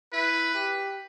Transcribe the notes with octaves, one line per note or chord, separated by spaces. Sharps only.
E4 B4
G4